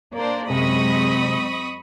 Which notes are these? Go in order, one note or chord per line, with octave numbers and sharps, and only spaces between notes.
A#3 D4 C5 D5
F#2 C3 G#3 C4 D#5 B5 C#6 D#6